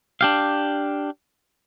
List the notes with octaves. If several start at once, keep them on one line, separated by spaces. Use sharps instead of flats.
D4 G4 F5